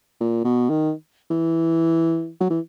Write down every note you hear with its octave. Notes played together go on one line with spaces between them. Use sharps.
A#2
B2
D#3
E3
F#3
E3